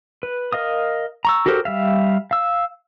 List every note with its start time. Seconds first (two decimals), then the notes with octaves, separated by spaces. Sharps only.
0.23 B4
0.52 A#4 D#5 F5 D#6
1.25 A#5 C#6 E6
1.46 F#4 G4 A4 A#4 C5
1.65 G3 E5 F5
2.31 F5 E6